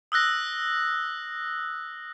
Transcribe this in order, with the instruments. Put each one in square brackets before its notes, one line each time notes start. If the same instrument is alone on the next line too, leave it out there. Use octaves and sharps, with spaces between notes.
[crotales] D#6 E6 F#6 A#6